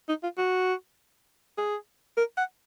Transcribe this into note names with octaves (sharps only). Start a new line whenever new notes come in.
D#4
F4
F#4
G#4
A#4
F#5